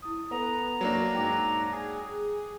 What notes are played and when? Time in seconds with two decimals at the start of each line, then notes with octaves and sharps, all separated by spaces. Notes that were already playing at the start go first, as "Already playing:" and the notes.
0.02 E4 D#6
0.31 B3 A4 A#5
0.81 F#2 F#3 A#3 D4
1.15 G#2 G5 D6 F#6
1.72 G#4